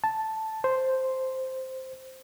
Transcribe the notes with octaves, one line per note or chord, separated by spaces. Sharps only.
A5
C5